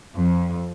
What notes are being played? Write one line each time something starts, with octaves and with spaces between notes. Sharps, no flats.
F2